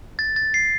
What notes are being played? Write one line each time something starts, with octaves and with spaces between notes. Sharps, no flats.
A6
A6
C7